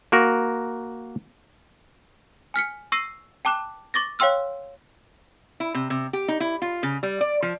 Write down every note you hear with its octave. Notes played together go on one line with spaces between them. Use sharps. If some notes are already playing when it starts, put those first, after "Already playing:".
A#3 F#4 A#4
G#5 F6 B6 C#7
C#6 E6 A#6 C7 D#7
G5 A5 D6 F#6 E7
C#6 D6 A6 A#6
C#5 F5 G5 C6 E6 F6
E4
C3
C3
G4
D#4
E4
F4
C#3
G3
D5
F3